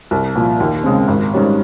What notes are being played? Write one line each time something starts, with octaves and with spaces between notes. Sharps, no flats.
C2
A#2 F3
D#2
C#3 G#3 C4
G#1
G#2 G3 C#4